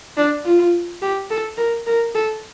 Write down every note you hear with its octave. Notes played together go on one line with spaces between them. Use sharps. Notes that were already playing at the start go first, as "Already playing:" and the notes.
D4
F4
G4
A4
A#4
A#4
A4